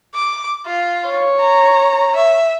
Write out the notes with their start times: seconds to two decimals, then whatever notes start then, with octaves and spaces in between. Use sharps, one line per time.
0.14 D6
0.66 F4
1.07 C#5
1.40 A#5
2.15 E5